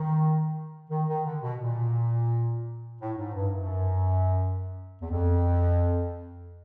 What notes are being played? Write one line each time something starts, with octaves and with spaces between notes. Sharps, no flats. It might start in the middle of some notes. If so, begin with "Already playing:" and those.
Already playing: D#3
D#3
D#3
D3
B2
A#2
A2
G#2
G2
F#2
E2
F2